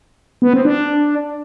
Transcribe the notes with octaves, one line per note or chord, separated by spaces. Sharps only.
B3
C4
D4